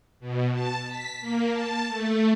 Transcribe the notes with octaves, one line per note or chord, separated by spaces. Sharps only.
B2
A5
B6
A#3
A5
A3